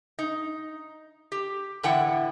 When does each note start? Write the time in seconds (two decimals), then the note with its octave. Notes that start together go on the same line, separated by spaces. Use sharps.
0.19 D#4
1.32 G4
1.83 A2 D3 E3 E4 F#5 G5